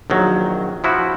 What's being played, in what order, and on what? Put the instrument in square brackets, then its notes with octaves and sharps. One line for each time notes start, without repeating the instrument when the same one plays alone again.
[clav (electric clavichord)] A#1 D#3 F#3
F3 E4 F#4